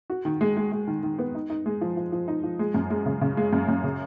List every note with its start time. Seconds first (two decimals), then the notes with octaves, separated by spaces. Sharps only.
0.10 F#4
0.25 D#3
0.41 G#3
0.57 G#3
0.72 G#3
0.87 D#3
1.03 D#3
1.19 B3
1.35 D#4
1.50 D#4
1.66 G#3
1.81 F3
1.97 F3
2.12 F3
2.28 D#4
2.43 F3
2.59 G#3
2.74 F#2
2.90 G#3
3.06 C#3
3.21 C#3
3.37 G#3
3.53 F#2
3.68 F#2
3.84 C#3